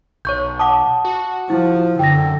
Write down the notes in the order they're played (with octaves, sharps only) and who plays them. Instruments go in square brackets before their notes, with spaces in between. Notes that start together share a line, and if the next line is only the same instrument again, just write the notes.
[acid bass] B1 [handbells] C#5 C#6 G6
[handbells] F#5 D6 D#6 [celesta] A5
[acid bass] F#4
[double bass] F3 [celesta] E4
[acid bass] F#2 [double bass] D3 [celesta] G5 A#6